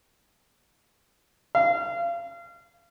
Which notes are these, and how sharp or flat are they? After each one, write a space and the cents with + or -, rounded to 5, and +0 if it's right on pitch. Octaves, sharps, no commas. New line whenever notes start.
F5 -30